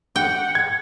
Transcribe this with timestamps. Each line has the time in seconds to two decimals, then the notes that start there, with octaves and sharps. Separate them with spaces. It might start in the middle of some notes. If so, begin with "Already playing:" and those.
0.16 F#5 G5
0.55 G#6